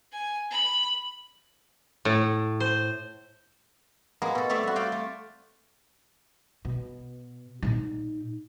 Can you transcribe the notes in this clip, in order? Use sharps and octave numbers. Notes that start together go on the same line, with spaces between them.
G#5
B5
A2
C5
G#3 A#3 B3 G#4 A#4
B2 A4
A3 C4 C#5 D5 E5 F5
G3 F#4
C5 D5 F5 G5
A3
B2
A#2 D#4